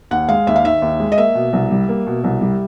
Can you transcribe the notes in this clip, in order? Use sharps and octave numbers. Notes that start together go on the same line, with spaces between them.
D#2 F#5
G#3 F5
D#2 E5
F5
D#3 E5
D#2
G#3
D#5
A#3 E5
B2
C2
G3
A#3
B2
C2
G3